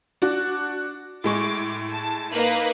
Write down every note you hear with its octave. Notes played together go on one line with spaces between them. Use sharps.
D4 F#4
A2 G#3 C#6 D6
A5
A#3 D#4 B4